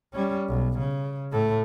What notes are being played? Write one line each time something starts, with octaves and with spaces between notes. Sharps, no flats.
G3 C#4
B1
C#3
A2 A3